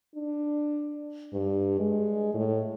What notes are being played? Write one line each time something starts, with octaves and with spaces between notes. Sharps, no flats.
D4
G2
G#3
A2